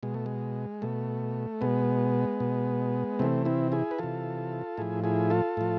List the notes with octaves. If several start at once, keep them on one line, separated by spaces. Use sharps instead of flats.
B2 G#3
A3
G#3
B2 A3
B2 G#3 B3
B2
C3 E3 A3 C4
C4 E4
E4 G#4
B4
C3 E3 F4 A4
A2 F3 E4 G#4
E4 G#4
F4 A4
A2 F3